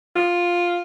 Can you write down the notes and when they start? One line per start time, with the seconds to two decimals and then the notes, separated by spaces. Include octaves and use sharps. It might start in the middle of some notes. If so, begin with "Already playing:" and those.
0.16 F4